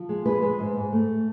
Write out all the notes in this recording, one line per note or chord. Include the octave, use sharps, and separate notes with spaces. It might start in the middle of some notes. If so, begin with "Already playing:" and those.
Already playing: F3
G#3
G#3 B4
G#3
G#2
G#2
A3